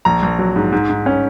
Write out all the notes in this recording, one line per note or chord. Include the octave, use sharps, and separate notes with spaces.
A#1 A#5
A#1
F#3
G#2
G#2
G#2
C#4